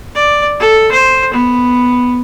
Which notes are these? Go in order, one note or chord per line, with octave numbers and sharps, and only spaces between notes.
D5
A4
C5
B3